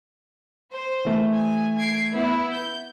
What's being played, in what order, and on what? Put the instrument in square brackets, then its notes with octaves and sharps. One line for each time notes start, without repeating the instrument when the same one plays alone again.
[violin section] C5
[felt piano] E3 A3
[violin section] G#5
G#6 C7 D7
B3 E4
G6